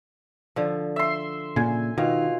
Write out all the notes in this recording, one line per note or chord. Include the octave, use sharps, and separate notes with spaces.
D3 F3
E5 C6
A#2 C#3 G#5
B2 D#3 F4